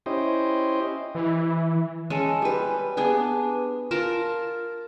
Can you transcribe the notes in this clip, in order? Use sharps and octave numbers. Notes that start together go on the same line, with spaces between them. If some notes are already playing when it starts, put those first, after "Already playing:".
C#4 E4 G4 C5 D#5
E3
G#3 C#4 A4
G3 B4
B3 D4 G#4
F4 A#4 A5 A#5